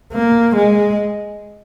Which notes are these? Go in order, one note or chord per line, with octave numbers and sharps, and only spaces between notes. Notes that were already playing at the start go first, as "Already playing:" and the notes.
A#3
G#3